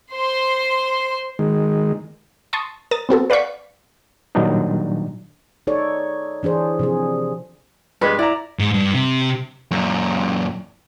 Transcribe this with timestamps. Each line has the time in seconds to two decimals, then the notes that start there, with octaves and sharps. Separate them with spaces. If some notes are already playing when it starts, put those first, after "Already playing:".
0.13 C5 C6
1.39 D#3 G#3
2.53 A5 C6 C#6 D#6
2.91 A#4 D#6 A6
3.09 B3 C4 F#4 A4
3.30 B4 D5 F5 F#5 C#6 B6
4.35 A#2 D#3 F#3 G3 D4 D#4
5.67 D#4 A4 C#5 D5
6.43 E3 D4 G#4 C5
6.79 C3 F3 G#4
8.01 G2 G#3 B4
8.19 E4 D5 A#5
8.59 G#2
8.74 G2
8.94 C3
9.71 F#2 A#2